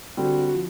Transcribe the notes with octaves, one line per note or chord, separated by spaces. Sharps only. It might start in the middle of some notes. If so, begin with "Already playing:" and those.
D3 G3 C4 F#4
F3